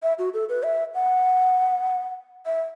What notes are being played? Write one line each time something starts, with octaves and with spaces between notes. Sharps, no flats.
E5
F#4
A4
B4
E5
F#5
E5